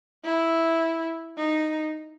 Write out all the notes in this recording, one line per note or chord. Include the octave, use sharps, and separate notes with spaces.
E4
D#4